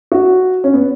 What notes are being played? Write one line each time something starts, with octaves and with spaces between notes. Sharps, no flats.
F#4
C#4
B3